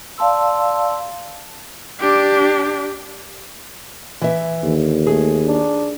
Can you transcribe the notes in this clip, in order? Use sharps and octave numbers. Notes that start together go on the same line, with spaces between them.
D5 F5 A5 C6 E6
D4 G4
E3 E5
D#2 D3
A3 G#4
D4